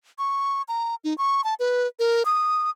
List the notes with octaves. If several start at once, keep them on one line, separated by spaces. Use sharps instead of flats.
C#6
A#5
D#4
C#6
A5
B4
A#4
D#6